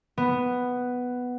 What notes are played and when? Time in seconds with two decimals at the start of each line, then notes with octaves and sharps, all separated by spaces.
0.18 B3